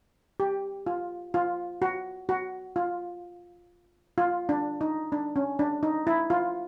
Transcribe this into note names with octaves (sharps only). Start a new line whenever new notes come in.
G4
F4
F4
F#4
F#4
F4
F4
D4
D#4
D4
C#4
D4
D#4
E4
F4